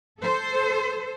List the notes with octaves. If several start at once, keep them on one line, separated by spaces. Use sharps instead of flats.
A4 C5